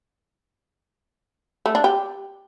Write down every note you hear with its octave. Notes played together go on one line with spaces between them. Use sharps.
A3
D4
G4